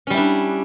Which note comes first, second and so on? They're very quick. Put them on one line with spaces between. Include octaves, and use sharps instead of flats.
C#4 G3 E4 D4